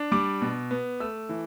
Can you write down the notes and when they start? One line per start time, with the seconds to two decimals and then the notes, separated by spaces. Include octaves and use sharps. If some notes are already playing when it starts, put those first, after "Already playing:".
Already playing: D4
0.12 G3 D6
0.41 B2
0.71 B3
1.00 A3 E6
1.29 E3